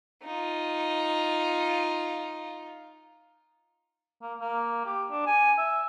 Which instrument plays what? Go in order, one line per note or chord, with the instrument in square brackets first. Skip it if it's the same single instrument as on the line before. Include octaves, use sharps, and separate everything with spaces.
[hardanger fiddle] D#4 F4
[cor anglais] A#3
A#3
G4
D4
G#5
E5